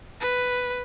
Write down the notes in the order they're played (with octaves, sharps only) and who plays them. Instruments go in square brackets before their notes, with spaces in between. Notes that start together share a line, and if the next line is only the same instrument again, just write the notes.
[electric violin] B4